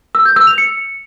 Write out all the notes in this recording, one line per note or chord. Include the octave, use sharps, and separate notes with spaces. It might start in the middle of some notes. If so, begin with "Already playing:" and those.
E6
G6
E6
F7
C#7